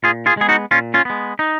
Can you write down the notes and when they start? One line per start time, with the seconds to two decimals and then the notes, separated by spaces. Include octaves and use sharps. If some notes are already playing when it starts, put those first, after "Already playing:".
0.03 A#2 F4 G#4
0.26 F4 G#4
0.37 G#3 B3 G#4
0.49 D#4 F#4
0.71 A#2 C#4 F4
0.94 C#4 F4
1.05 G#3 B3
1.39 D#4